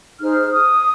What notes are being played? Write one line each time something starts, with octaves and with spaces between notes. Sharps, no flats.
D#4 G#4 C5 F6
D#6